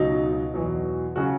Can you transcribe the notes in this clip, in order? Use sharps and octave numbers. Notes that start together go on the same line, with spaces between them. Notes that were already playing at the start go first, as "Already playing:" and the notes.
Already playing: C#2 B2 F#3 D#4
E2 B2 F#3
C#3 F#3 F#4